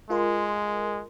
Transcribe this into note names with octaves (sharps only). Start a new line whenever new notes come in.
G#3 F4 A#4 C6